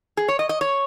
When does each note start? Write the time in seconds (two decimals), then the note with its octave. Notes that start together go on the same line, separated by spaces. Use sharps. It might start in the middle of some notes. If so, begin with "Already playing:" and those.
0.17 G#4
0.28 C#5
0.39 D#5
0.49 D#5
0.61 C#5